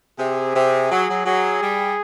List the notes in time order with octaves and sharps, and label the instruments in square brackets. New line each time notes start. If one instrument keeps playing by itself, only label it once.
[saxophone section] C3 [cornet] G#4
[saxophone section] C3
F#3
F#3
[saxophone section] F#3 [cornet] G#4
[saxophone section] G3